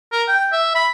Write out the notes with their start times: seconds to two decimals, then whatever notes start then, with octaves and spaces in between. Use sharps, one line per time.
0.12 A#4
0.28 G5
0.53 E5
0.75 B5